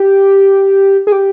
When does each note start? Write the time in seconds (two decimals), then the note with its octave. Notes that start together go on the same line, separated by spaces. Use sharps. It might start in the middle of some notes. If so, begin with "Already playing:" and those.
Already playing: G4
1.07 G#4
1.12 G4